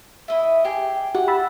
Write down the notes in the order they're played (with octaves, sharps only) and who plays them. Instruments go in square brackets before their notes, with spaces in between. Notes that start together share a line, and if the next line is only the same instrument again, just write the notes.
[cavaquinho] E4 D#5 E5
G4 G#4 G#5
[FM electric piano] F#4 G4 [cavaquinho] F#5
[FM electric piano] B5 E6 A6